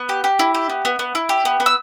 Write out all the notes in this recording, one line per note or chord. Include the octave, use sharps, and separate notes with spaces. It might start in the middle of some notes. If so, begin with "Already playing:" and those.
Already playing: B3
G4
G4
E4
G4
B3
B3
B3
E4
G4
B3
B3
E6